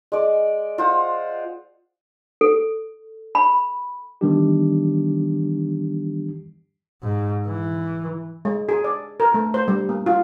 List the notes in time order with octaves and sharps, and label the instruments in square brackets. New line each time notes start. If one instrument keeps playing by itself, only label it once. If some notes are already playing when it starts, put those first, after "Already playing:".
[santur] G#3 D5
F4 C5 F#5
[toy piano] A4
B5
[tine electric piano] D#3 E3 G3 B3 D4 G4
[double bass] G#2
E3
[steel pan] G#3
G#4
D5
A#4
A3
C5
G3
A#3
F4